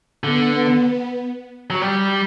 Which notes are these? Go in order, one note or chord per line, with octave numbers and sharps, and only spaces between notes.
D3 B3
F#3
G3